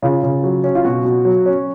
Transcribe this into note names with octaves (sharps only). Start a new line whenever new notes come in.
C#3 F4
C#3
F#3
C#4
F4
B2 F#4
B2
F#3
C#4